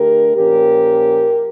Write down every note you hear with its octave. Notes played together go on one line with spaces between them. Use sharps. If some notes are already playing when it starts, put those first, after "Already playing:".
Already playing: D3 A3 D4 G4 A#4
A#2 F3 C#4 G4 A#4